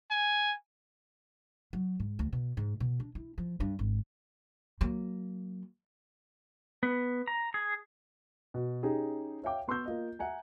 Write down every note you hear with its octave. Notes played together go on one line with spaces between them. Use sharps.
G#5
F#3
G#2
D2
B2
G#2
B2
D4
E4
F3
G2
G#1
F#3 A#3
B3
A#5
G#4
B2
C#4 D#4 G4 G#4
C#5 E5 F5 G5 D6
B3 C6 C#6 E6 G6
A#3 F4 D#5
E5 F#5 G#5 A#5